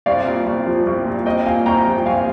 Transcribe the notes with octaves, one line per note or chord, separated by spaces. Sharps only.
C2 D5 F5
A#2
C2
F3
C2
A#2
C2 D#5 G5
A#2 F5 G#5
C2 G5 A#5
F3
G5
C2 F5 G#5